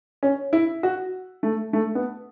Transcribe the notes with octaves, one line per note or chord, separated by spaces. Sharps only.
C#4
E4
F#4
A3
A3
B3